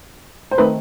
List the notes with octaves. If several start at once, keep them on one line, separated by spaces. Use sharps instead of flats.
C5
D#3 A3 C4 D#4 B4